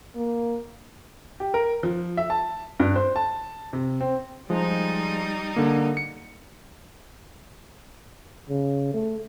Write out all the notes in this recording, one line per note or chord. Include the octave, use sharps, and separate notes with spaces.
A#3
G4
A#4
F3
E5
A5
G2
C5
A5
C3
C4
F3 G3 G#3 D#4
D3 A#3
C#7
C#3
A3